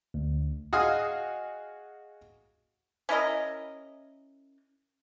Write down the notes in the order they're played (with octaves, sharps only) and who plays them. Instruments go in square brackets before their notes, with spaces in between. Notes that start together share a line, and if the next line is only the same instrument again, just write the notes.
[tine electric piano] D2
[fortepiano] F#4 G#4 D#5 F5 D#6 F6
[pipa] C#4 E4 A#4 D#5